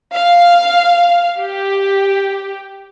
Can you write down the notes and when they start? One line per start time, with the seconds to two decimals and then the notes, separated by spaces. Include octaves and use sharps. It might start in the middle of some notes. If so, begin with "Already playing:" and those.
0.13 F5
1.41 G4